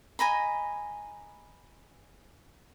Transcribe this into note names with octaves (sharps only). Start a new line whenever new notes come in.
D#5 G#5 A#5 B5